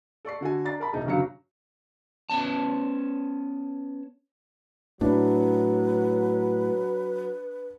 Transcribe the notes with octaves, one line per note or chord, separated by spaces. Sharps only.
A4 D5 C#6 C7
D3 F#4 A4 G#5
D4 A#5 A6 C7
A#4 A5 B5
E1 C2 D#4 G#4
G1 G2 C#3 F#3 F5 C#7
B3 C#4 A5
A2 F#3 D4 B4